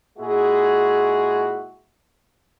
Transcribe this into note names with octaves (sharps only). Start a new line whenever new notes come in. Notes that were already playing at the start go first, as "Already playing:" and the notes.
A#2 G#3 E4 F#4 G#4